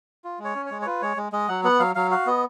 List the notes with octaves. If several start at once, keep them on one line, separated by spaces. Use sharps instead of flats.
F4
G#3
C#5
C#4
C#5
G#3
C#5
F4 B4
G#3 C#5
G#3
G#3 D#5
F#3 F#5
B3 F#5
F#3 F5
F#3 F5
F#4 F5
B3 D#5